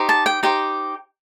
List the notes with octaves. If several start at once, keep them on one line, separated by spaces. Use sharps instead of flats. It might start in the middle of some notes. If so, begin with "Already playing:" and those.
Already playing: D#4 G4 C5
A5
G5
D#4 G4 C5 G5